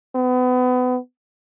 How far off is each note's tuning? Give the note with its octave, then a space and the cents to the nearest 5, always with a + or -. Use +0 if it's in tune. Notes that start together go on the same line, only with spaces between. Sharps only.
B3 +30